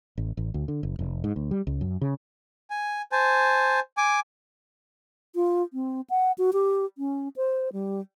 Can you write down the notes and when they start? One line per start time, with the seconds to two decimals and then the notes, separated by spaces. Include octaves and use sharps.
0.18 A1
0.37 A1
0.54 D2
0.68 D3
0.83 F#1
0.99 F1
1.24 G#2
1.36 D2
1.51 G3
1.67 C#2
1.81 F#2
2.01 C#3
2.70 G#5
3.12 C5 G#5 A5
3.97 G#5 D6
5.34 F4
5.73 C4
6.10 F#5
6.38 F#4
6.53 G4
6.98 C#4
7.36 C5
7.73 G3